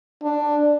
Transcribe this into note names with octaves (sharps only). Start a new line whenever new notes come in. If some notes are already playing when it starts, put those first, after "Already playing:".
D4